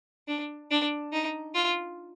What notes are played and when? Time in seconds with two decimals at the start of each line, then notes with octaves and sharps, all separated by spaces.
0.28 D4
0.71 D4
1.13 D#4
1.55 F4